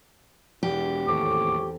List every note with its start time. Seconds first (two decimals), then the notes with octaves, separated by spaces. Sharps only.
0.63 E1 E2 G4
1.08 D#2 A2 A3 C4 A4 C#5 D6